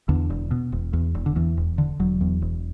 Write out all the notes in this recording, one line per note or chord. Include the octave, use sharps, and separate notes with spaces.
E2 D3
E1
B2
E1
E2
E1
D3
E2 E3
E1
D3
E1 F#3
E2
E1